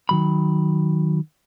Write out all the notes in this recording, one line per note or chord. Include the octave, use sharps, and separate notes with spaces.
D#3 F#3 B5